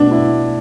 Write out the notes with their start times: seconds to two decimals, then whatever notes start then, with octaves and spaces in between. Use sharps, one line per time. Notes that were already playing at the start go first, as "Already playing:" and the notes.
Already playing: B2 D4
0.11 E4